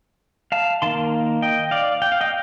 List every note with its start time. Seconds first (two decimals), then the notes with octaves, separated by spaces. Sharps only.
0.52 F5 A5
0.82 D#3 A#3 A5 C6
1.42 D#5 G5
1.71 D5 F5
2.02 G5
2.12 F5
2.21 D#5 G5